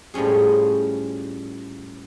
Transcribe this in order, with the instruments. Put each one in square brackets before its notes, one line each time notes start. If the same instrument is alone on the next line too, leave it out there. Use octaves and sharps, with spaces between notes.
[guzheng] A2 F3 G3 C#4 G#4